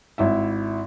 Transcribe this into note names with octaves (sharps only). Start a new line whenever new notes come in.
G#1 E4 E5